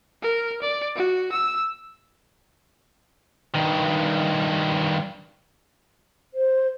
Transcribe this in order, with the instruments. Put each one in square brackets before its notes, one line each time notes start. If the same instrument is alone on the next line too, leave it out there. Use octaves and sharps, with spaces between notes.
[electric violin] A#4
D5
F#4
E6
[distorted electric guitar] G2 D#3
[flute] C5